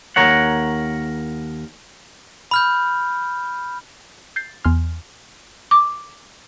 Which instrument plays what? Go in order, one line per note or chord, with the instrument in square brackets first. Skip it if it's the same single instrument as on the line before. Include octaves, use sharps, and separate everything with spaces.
[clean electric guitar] D#2 A#4 C#5 F#5
[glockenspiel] B5 F6 G6
[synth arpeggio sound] G6 A6 C7
E2 G#5 C6 F6
[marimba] D6